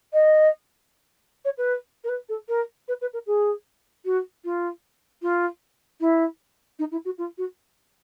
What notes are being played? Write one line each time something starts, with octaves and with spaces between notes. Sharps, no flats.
D#5
C#5
B4
A#4
B4
A4
A#4
B4
B4
A#4
G#4
F#4
F4
F4
E4
D#4
E4
F#4
F4
F#4